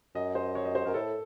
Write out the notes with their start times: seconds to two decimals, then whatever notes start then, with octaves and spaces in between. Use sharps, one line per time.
0.15 F#2 D#5
0.35 C5
0.55 C#5
0.65 D#5
0.75 C5
0.85 F#2 A#4
0.94 A2 A4